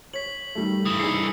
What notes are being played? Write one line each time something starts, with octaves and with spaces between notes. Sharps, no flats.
C#5 B6 F#7
D#3 G3 A3
G2 E3 D#6
D#4 G#4 A4 E6 C7 C#7